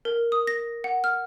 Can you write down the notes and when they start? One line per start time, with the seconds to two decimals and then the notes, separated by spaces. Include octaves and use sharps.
0.05 A#4
0.32 D#6
0.47 A#6
0.84 F#5
1.04 F6